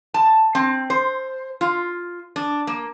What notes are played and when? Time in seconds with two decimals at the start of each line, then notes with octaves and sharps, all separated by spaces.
0.14 A5
0.55 C4
0.90 C5
1.61 F4
2.36 D4
2.67 A#3